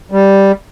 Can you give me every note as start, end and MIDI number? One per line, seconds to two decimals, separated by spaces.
0.12 0.52 55